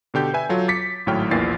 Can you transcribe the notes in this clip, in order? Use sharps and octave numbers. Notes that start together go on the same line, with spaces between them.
B2 D3 G4 G6
B4 E5 G#5
F#3 F4 A4
D6 A6 B6 C#7
G#1 A2 F#3 G5 F6
A#1 E2 A#2 E3 A6 C7